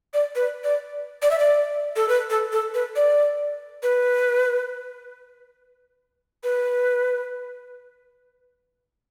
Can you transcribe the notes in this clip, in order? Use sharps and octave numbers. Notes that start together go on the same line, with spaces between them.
D5
B4
D5
D5
E5
D5
A4
B4
A4
A4
B4
D5
B4
B4